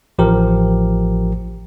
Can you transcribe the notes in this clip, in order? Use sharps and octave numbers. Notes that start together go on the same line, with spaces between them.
A1 F3 G4 A#4